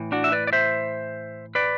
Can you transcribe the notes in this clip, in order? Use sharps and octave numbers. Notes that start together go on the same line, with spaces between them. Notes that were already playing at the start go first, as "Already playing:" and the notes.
Already playing: A2 E3
D4 F#4
E5
B4 D5
D5
C5 E5
B4 D5